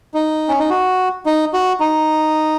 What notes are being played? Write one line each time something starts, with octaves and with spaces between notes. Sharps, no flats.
D#4
C#4
D#4
F#4
D#4
F#4
D#4